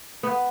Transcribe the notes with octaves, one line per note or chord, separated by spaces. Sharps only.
B3